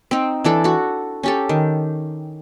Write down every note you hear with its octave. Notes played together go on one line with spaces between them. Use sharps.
C4 D#4
E3 D4 A4
F#4 A4
C#4 G4 A4
D#3